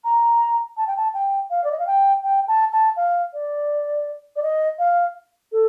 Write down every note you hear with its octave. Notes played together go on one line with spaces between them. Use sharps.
A#5
A5
G5
A5
G5
F5
D5
D#5
F5
G5
G5
A5
A5
F5
D5
D5
D#5
F5
A4